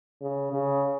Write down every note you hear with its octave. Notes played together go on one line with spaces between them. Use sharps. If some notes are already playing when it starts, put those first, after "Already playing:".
C#3
C#3